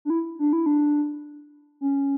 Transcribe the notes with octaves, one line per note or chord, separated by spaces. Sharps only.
D4
E4
D4
E4
D4
C#4